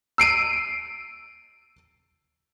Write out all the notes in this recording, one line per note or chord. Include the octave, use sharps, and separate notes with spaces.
E6 C7 D7 D#7